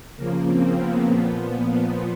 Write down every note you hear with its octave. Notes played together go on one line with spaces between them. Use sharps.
C#3 F3 A#3
C4
B3
A#2 F3